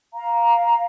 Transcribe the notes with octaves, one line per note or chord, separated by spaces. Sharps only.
F5 A#5